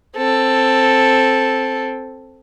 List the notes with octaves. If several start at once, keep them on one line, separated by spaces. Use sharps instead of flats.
C4 A4